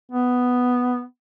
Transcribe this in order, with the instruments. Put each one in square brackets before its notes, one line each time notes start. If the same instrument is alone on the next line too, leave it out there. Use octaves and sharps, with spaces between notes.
[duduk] B3